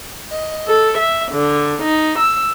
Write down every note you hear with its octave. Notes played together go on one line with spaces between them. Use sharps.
D#5
A4
E5
D3
D#4
E6